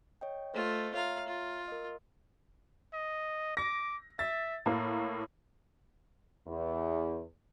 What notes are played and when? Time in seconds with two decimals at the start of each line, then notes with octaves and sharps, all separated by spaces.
0.21 C#5 D#5 G5
0.54 A3 F4 C5 D#5
0.94 F4 C#5 E5 F5 A#5
1.27 F4
1.68 A#4 D#5
2.93 D#5
3.57 D6 A#6
4.19 E5 A6
4.66 A2 A#3 A#4
6.47 E2